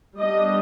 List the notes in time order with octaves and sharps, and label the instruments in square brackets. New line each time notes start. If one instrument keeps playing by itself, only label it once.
[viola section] G3 B3 D4 D#5